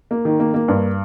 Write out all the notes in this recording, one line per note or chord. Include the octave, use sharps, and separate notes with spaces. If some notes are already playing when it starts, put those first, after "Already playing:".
A#3
D#3
A#3
A#3
G2